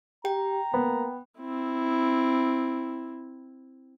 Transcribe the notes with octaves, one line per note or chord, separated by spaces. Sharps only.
G4 G5 A#5
A#3 B3
C4 E4